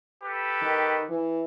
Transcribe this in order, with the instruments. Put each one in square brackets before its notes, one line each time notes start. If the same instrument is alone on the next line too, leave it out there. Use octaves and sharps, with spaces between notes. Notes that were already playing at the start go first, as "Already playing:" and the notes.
[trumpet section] G4 A4 B4
[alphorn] D#3
E3